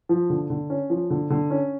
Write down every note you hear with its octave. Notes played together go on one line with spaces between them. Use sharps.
F3
D3
D3
C#4
F3
D3
D3
C#4